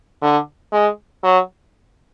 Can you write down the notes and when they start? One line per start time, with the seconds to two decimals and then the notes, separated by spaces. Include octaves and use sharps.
0.22 D3
0.72 G#3
1.24 F#3